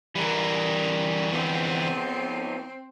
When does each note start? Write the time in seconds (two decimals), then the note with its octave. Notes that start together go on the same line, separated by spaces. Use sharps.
0.15 D3 E3 G3 A#4
1.32 F3 B3 C4